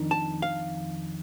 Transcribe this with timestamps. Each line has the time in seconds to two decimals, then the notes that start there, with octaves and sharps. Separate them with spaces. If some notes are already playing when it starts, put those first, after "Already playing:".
Already playing: F2 D#3 D4
0.11 A5
0.42 F5